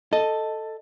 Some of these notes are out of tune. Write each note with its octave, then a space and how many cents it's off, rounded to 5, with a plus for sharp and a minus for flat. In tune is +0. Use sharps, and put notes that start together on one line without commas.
A4 +5 D#5 +0